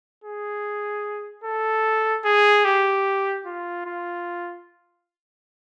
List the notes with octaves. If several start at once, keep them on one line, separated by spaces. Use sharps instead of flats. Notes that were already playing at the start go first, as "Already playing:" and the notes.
G#4
A4
G#4
G4
F4
F4